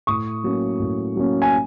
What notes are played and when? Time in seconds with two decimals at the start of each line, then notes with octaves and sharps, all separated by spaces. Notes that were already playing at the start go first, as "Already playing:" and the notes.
0.07 A2 C#6 D#6
0.44 F#3 A#3 C#4
0.80 A2
1.16 F#3 A#3 C#4
1.42 G#5